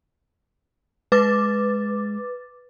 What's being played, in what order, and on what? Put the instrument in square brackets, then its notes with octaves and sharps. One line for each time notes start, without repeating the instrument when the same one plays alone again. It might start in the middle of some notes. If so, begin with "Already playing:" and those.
[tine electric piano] G#3 [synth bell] B4 D6 A6